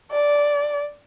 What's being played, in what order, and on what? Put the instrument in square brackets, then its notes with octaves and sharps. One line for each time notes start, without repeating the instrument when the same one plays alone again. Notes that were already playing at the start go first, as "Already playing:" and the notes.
[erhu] D5